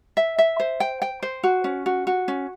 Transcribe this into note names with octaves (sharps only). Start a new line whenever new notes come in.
E5
E5
C5
G5
G5
C5
F#4
C#4
F#4
F#4
C#4